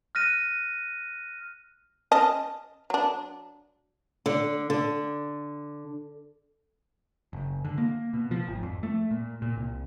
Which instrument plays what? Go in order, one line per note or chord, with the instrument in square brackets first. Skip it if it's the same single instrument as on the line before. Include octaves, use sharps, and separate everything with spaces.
[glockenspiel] F6 F#6 A#6 D#7
[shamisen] C#4 D#5 A5
F#3 D4
[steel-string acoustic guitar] D3
D3
[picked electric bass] F#1
D3
A#3
B2
F3
G#1
F2
A3
A#2
A#2
C2